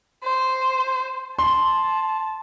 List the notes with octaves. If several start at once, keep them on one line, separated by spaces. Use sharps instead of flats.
C5
A5 C6